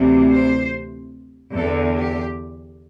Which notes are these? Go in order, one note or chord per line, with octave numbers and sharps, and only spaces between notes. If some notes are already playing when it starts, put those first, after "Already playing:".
Already playing: D2 C3 E3
C5
E2 D3 A4
G4